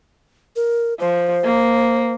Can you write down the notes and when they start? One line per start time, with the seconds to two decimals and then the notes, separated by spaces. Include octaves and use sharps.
0.56 A#4
1.00 F3 C5
1.44 A#3